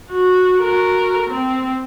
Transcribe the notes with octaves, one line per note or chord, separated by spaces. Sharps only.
F#4
F#4 A#4
C4